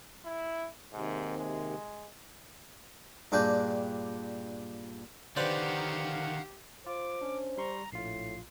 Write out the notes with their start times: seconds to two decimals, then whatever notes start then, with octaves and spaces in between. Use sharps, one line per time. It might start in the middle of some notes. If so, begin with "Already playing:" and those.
0.25 E4
0.92 D#2 G#2 C3
1.38 G#3
3.32 G2 A#2 D4 G#4 G5
5.36 D3 D#3 G4 B4 C5 D5 F5 F#5
6.86 F4 C5 D6
7.21 C#4 D4
7.58 G3 A#5 C6 C#6
7.93 A#1 A2 F4 C7